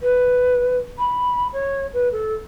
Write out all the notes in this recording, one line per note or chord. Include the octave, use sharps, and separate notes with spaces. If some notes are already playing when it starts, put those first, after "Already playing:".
B4
B5
C#5
B4
A4